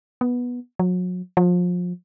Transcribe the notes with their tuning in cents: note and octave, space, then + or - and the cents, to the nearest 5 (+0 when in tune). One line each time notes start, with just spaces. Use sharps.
B3 -10
F#3 -35
F3 +30